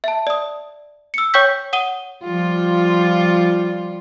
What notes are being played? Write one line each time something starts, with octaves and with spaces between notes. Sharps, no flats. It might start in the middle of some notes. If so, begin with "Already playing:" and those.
E5 A5
D5 D#6
E6 C#7
C#5 G5 C#6 G6 B6
F#5 D#6 D#7 G7
F3 G3 F4